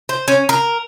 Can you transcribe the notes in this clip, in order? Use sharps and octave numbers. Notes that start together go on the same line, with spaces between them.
C5
C#4
A#4